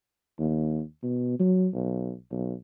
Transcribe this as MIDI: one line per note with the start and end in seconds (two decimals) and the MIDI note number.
0.39 0.81 39
1.03 1.35 47
1.40 1.68 54
1.74 2.12 35
2.31 2.53 35